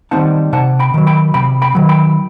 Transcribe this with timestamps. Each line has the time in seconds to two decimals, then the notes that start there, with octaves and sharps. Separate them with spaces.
0.11 D#3 G3 C4 D#4 F#5 A5
0.53 C3 F#5 A5
0.79 G5 B5
0.94 D#3 F#3
1.07 G5 B5
1.34 C3 G5 B5
1.62 G5 B5
1.75 D#3 F#3
1.89 G5 B5